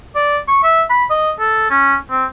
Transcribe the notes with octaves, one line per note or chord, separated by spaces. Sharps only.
D5
C#6
E5
B5
D#5
A4
C#4
C4